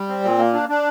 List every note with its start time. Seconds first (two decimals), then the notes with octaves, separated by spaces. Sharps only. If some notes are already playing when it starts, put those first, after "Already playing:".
Already playing: G3
0.08 C4
0.24 A#2
0.38 A#3
0.53 D4
0.69 D4